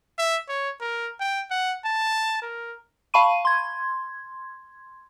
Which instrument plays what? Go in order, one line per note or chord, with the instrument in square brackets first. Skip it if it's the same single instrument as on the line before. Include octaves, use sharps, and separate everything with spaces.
[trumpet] E5
C#5
A#4
G5
F#5
A5
A#4
[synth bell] F5 A5 B5 C#6 D#7
C6 G#6